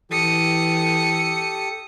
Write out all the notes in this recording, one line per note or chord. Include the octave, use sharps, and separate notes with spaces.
E3 G4 A4 D#6 C#7